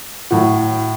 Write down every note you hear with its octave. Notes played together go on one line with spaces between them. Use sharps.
A2 F#3 F#4